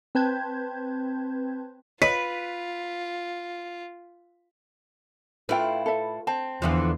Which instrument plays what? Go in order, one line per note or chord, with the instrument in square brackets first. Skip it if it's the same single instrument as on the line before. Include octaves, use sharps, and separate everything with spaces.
[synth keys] C4 B4 A5 G6 G#6
[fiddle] F4 [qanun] B4 [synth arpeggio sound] C#5 D#5 [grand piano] B6
[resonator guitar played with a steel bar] A2 E4 [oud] F4 B4 [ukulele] A4 G5
[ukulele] A4 E5
[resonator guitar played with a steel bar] C4 [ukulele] A5
[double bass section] E2 [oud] D3 E3 F3